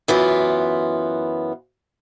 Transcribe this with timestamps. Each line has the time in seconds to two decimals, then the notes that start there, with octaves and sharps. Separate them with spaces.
0.08 F#2 E3 B3 F4